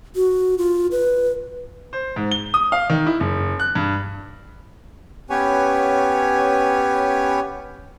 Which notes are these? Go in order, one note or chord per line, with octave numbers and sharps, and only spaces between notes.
F#4
F4
B4
C5
G#2
G7
D#6
F5
D#3
E4
F#1
F#6
G2
B3 C#4 G4 B4 C#5 G#5